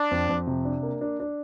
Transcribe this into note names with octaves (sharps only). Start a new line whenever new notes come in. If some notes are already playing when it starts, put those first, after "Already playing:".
Already playing: D4
F2
F2
C3
D4
A#3
D4
D4